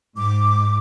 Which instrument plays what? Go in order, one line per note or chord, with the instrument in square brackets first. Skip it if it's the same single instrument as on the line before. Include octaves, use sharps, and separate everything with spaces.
[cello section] G#2 [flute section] D6